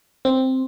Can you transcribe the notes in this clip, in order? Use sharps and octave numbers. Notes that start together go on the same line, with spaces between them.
C4